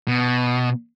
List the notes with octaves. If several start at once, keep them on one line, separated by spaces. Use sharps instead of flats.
B2